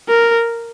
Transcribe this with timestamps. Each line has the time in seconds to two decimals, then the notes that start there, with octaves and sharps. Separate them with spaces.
0.09 A#4